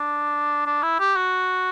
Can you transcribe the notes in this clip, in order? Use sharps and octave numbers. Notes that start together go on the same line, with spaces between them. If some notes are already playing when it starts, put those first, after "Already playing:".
Already playing: D4
D4
E4
G4
F#4